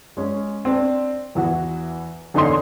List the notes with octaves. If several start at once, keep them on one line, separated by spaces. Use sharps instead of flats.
G#3 C#4
C4 D4
E2 E3 F#4
E2 D3 D#4 C#5 C6